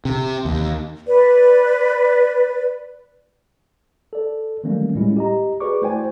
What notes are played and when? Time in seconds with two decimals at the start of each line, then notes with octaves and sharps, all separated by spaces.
0.05 C3
0.45 D#2
1.06 B4 D5
4.13 A4 D5
4.64 D#3 F#3 G3 A3 A#3 C#4
4.95 A2 G3 G#3 C#4 E4 F4
5.17 G4 D#5 A#5
5.60 F#4 G#4 B4 D5 C#6 D6
5.82 A3 E4 C5 D5 G5 G#5